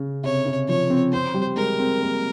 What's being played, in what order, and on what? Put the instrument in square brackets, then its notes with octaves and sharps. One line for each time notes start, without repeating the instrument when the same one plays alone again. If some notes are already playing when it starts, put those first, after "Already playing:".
Already playing: [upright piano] C#3
[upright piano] C3 [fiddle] C#5
[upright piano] C#3
[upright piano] F3 [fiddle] C#5
[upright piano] C4
[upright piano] C4 [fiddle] C5
[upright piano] G3
[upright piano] G#3 [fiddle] A#4
[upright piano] C4
A#3